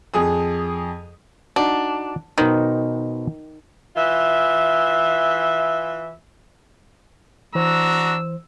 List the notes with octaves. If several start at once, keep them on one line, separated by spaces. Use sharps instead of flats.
F2 G#4 D#6
D4 D#4 F#4
B2 D#3 D#4 C5
E3 F4 E5
E3 D4 F#4 C5 A#5 E6